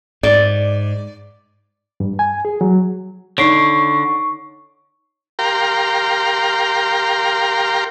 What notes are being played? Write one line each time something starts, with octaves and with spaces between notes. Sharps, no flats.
G#2 D5
G2
G#5
G#4
F#3
D3 D#4 C#5 C#6 C7 D7
G4 A#4 F5 G5 A#5 C6